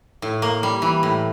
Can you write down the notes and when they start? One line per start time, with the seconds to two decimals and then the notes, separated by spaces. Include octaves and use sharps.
0.22 A2
0.42 A#3
0.63 G3
0.82 E3
1.03 A2